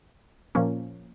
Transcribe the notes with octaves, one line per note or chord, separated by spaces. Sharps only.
A#2 F3 A#3 C#4